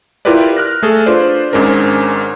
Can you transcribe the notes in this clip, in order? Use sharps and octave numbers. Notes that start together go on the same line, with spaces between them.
E4 F4 G4 A#4 B4 D5
F6 F#6 A#6
A3 G#4 A4
D4 F4 B4 C5 D5
G#1 G#2 C#4 D4 A#4 C5